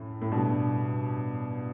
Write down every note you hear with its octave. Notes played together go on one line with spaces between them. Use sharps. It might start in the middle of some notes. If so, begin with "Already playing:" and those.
Already playing: F#2 A2
A2
G2 B2